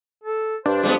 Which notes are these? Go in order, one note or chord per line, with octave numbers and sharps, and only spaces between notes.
A4
G2 D4 C5
F2 G3 G#3 B3